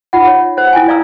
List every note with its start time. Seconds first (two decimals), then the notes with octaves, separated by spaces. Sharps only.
0.13 D#4 F4 F#5
0.27 C#5
0.57 C5 F#5
0.73 E4 G5 G#5
0.88 D5 F5 A#5 D#6 E6